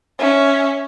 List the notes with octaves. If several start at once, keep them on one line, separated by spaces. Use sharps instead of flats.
C#4 E5